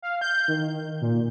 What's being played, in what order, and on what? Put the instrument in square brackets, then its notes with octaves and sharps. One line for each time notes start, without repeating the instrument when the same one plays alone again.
[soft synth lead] F5
G6
D#3
A#2